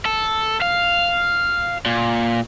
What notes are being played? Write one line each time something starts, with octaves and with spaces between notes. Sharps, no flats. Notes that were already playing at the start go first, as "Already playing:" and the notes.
A4
F5
A#2